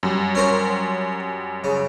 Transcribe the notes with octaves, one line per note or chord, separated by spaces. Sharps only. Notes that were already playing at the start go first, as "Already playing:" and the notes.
F#2 G3
C#4 A#4 C5
C#3